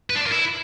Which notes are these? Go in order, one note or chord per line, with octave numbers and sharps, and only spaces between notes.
B4
D4
D5
A#4
E4